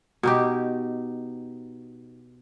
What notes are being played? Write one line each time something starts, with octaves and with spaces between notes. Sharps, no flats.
B2 D#4 G4